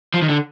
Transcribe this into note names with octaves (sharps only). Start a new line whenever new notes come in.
F3
D#3
D3